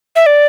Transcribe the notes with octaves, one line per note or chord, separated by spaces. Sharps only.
E5
D5